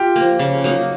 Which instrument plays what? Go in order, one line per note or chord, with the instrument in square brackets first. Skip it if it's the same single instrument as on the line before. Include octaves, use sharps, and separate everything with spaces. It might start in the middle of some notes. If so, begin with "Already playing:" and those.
Already playing: [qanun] F4 [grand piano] G4 G5
[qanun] F3 A#3
C#3
F#3 A#3 D#4